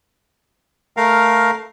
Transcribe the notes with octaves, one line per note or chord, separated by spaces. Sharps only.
A3 A#4 F5